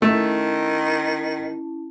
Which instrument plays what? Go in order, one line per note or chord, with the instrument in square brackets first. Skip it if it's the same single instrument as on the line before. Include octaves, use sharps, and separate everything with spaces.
[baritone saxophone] D#3 [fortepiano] A3 [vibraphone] C#4 E4 A5